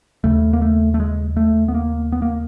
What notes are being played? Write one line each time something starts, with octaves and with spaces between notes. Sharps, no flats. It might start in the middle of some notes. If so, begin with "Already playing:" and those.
D#2 C#3 A3
A#3
A3
A3
G#3
A3
B3
A#3
B3
A#3